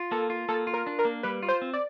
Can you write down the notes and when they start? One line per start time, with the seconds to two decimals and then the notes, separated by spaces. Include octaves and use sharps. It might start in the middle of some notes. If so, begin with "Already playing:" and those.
Already playing: F4
0.11 A#3 A4
0.30 F4
0.49 A#3 A4
0.67 F4
0.74 A#4
0.87 D4
0.99 A#4
1.05 A#3
1.23 G3 B4
1.43 F4
1.49 C5
1.62 C4
1.74 D5